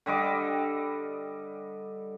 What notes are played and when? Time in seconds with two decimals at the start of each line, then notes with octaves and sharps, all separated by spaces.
0.06 D3 G3 D#5 D6